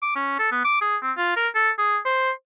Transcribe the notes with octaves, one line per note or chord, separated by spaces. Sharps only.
D6
C#4
A4
B3
D6
G#4
C4
F4
A#4
A4
G#4
C5